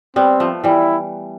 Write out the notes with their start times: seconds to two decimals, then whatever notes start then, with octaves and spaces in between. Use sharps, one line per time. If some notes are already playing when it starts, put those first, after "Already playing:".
0.16 G3 B3 C4
0.40 F3 A3
0.64 E3 G3 E4